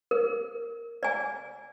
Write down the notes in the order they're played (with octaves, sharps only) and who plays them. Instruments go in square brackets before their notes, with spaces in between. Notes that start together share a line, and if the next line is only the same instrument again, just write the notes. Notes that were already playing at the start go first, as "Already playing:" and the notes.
[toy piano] A#4
D5 G#5